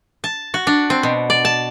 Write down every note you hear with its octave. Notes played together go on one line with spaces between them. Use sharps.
A5
F#4
D4
C4
B2
D5
A5